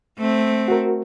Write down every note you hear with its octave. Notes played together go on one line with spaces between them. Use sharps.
A3 C4
F#4 A#4